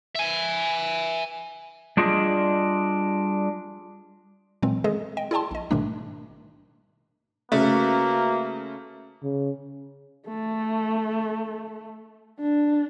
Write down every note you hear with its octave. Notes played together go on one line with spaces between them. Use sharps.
E5 G#5
G3 D4 F4 G#4 D#5
A#2 E3 F#3 G#3 C4
D#3 G#3 G#4 A4 B4 D#5
D#5 G5
E4 G#4 D5 G5 A5 C6
A#1 D#5
G#2 B2 D#3 G3 A3 D4
C#3 A3 A#3 F#4 B4
C#3
A3
D4